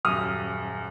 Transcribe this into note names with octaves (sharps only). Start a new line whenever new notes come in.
D#1 F#2 D#6 F6